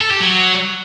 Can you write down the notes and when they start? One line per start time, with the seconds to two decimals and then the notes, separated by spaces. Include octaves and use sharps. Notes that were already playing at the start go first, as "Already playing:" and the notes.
0.01 A4
0.11 G4
0.20 F#3